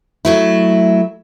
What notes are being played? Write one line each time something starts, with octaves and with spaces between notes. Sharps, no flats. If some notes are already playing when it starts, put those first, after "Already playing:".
F#3 A3 E4